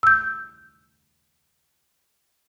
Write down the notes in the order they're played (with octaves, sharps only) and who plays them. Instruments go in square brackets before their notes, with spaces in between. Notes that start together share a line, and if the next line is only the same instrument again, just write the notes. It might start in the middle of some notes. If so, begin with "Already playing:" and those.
[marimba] E6 G6